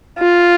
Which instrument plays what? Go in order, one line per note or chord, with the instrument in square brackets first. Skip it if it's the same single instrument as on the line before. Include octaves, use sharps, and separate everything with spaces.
[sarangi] F4